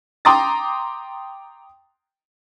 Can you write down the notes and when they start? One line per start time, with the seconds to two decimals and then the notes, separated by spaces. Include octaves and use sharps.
0.25 G5 A#5 C6 D6 D#6 A6